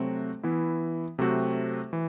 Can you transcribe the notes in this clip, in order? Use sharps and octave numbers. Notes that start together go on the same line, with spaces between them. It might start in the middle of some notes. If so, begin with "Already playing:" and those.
Already playing: C3 F#3 A3 C4 F#4
E3 B3 E4
C3 F#3 A3 C4 F#4
E3